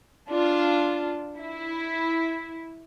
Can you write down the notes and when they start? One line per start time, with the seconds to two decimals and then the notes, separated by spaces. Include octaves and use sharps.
0.28 D4 F4
1.39 E4